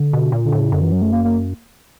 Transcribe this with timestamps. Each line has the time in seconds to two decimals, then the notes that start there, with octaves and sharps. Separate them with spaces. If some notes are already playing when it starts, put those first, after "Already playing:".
Already playing: D3
0.13 B2
0.32 A#2
0.45 D3
0.52 A2
0.59 C#3
0.72 F#2 D3
0.82 E3
0.92 F#3
1.02 A3
1.12 A#3
1.24 A#3